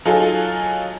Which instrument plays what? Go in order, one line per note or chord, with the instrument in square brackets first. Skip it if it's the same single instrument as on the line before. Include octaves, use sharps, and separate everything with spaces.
[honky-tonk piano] F#3 D#4 F4 G#4 A4